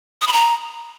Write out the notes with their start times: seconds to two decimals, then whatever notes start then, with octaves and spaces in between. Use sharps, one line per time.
0.22 D#6
0.27 B5
0.33 A#5